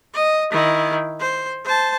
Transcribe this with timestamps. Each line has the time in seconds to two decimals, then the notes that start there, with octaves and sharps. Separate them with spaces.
0.14 D#5
0.51 D#3 E4
1.20 C5
1.64 C5 A5